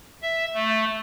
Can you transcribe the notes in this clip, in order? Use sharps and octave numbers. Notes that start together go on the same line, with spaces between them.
E5
A3